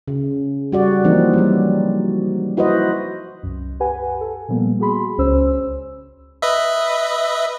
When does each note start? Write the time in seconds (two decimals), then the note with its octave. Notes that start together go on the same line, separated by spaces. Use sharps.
0.08 C#3
0.72 G3 F#4 D5
1.04 E3 F3 A#3 C4 D#4
1.33 F#3 G3
2.57 E4 F#4 B4 C5 D#5
3.43 C2 F#2
3.80 G4 B4 F#5 G#5
4.21 A4
4.48 A#2 F3 G3 A#3 B3
4.80 F#4 G#4 B5 C6
5.18 C#2 C#4 C5 E6
6.42 B4 D#5 E5